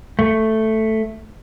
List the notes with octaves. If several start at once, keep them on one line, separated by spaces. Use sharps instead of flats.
A3